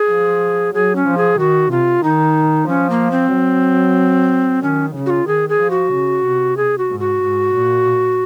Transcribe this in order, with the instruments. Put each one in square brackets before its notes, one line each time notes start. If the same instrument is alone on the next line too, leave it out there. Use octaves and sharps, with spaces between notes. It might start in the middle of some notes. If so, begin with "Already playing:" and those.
Already playing: [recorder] G#4
[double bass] F3
[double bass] F#3 [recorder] G#4
[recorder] C#4
[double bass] F3
[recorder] G#4
[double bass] D#3 [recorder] F#4
[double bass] C3 [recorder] F4
[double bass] D#3 [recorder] D#4
[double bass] F3 [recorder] C#4
[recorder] A#3
C4
[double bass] F#3
[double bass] D#3 [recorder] C#4
[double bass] C#3
[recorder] F#4
F4
[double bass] D#3 [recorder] G#4
[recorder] G#4
[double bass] F3
[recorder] F#4
[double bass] C#3
C3
[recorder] G#4
F#4
[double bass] G#2
[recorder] F#4
[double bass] G#2
A#2